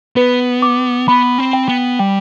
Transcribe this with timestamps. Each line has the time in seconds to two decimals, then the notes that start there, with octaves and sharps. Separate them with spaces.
0.16 B3 B4
0.62 D6
1.08 B3 B5
1.38 C4
1.53 G5
1.69 B3
1.99 G3 G5